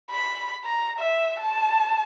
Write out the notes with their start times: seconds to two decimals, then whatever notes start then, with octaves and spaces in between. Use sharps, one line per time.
0.11 B5
0.64 A#5
0.98 E5
1.39 A5